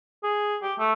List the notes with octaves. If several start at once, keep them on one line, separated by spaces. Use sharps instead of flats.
G#4
G4
A3